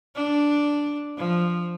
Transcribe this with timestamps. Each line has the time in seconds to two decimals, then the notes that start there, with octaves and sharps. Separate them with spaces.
0.15 D4
1.18 F3